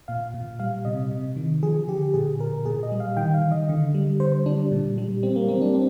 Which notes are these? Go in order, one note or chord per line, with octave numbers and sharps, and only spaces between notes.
A#2 F5
A#2
G3 F5
C3 D#5
C3
D#3
F3 G#4
D3 G4
A#2 G#4
A#2 A#4
A#2 G#4
D#5
G3
F5
D#3 G5
F5
D#3
D#5
D3
G3
D3 C5
G3 D4
A#2
G3
G3 C4
A#3
G3 C4
D4
C4